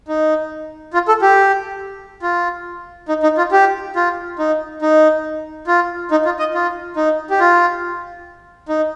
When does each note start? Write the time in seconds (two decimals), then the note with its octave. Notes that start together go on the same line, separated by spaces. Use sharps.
0.08 D#4
0.93 F4
1.08 A4
1.22 G4
2.22 F4
3.09 D#4
3.23 D#4
3.38 F4
3.52 G4
3.96 F4
4.39 D#4
4.82 D#4
5.67 F4
6.11 D#4
6.25 F4
6.39 D#5
6.54 F4
6.96 D#4
7.30 G4
7.40 F4
8.69 D#4